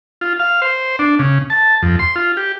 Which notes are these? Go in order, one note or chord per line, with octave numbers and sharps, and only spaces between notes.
F4
F5
C5
D4
C#3
A5
F2
C6
F4
G4